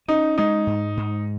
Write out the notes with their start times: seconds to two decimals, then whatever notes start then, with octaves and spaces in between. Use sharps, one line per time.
0.08 C#4 D#4
0.38 G#3 D#4
0.67 G#2
0.97 G#2